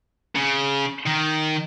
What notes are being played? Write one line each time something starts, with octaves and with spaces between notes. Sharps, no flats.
C#3
D#3